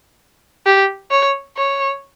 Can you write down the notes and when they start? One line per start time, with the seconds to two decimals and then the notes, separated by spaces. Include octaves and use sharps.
0.66 G4
1.11 C#5
1.57 C#5